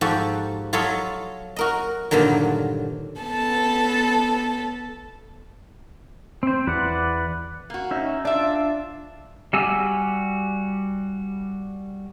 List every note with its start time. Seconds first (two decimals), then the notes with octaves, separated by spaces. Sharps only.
0.01 G#2 F3 F#4 G4 A4
0.73 F#3 F4 A4 C#5 D#5 B5
1.56 F#4 A#4 D#5
2.11 G2 A#2 D3 D#3 F#3
3.20 B3 A4 A5
6.43 C4 C5
6.67 E2 B4 D5 F#5
7.70 A#3 F#4
7.91 C#4 D#4 E5
8.25 D4 F4 D5 E5
9.53 G3 F#4 G4 G#5 E6